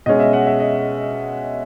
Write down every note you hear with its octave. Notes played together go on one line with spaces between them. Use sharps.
B2 G#3 C#4 D#5
E5
F#5
E5
D#5